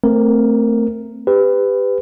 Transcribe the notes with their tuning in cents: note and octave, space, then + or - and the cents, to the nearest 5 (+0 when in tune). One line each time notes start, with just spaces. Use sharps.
A3 +20 C4 +0 A#4 +0
G4 +20 B4 +20